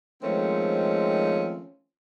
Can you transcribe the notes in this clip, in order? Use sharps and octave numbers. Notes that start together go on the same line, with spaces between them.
D#3 F3 G#3 A3 C4 C#4